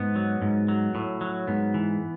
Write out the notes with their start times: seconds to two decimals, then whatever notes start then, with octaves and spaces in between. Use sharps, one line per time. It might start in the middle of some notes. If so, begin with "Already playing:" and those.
Already playing: G#2 B3
0.16 F#3
0.42 G#2
0.68 F#3
0.95 A2
1.21 F#3
1.47 G#2 B3
1.74 E3